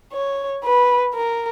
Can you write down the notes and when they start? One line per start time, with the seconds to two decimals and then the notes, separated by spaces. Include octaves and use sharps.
0.13 C#5
0.64 B4
1.15 A#4